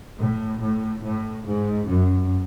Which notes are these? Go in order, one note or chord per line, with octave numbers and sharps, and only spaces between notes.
A2
A2
A2
G#2
F#2